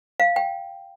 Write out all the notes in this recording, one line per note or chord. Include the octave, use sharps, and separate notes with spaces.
F5
G5